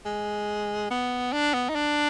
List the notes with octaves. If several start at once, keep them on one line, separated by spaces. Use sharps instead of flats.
G#3
B3
D4
B3
D#4
D4